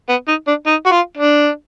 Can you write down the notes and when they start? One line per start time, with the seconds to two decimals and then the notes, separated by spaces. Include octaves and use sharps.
0.09 B3
0.28 D#4
0.47 D4
0.66 D#4
0.86 F#4
0.91 F4
1.17 D4